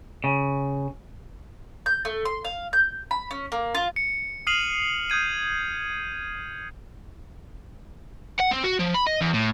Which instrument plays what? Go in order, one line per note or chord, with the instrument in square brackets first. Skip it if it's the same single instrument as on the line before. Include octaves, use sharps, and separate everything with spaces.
[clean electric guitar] C#3
[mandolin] G6
A3
C6
F5
G6
B5
C#4
A#3
F4
[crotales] C#7
D#6 F6 C7 D#7 F7 F#7
D#6 G6 G#6 D#7
[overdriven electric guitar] F#5
C4
F#4
F3
B5
D#5
E2
A2